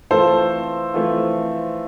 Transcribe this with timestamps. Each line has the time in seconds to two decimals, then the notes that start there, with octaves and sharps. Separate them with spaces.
0.10 E3 A3 C4 F4 A4 C5
0.94 E3 A3 C4 F4